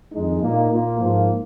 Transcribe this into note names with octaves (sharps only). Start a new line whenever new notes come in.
F2 D#3 G#3 D#4
A#2 A#3 D#4
A#2 A#3 F4
G#2 F3 A#3 F4